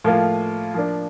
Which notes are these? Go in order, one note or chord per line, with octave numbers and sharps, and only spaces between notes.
A2 F3 A#3 F4
F3 A#3 D4